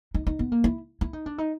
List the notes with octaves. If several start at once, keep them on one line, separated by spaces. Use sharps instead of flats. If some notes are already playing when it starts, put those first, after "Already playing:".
D#4
D#4
B3
A#3
E4
E4
D#4
D4
D#4